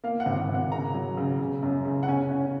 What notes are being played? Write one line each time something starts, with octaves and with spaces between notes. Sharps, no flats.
A#3 F5
F#5
G#1
F#5
G#1
F#5
C#3 A#5
F#3
C#3
C#3
F#2
C#3
F#5
C#4 G#5
C#4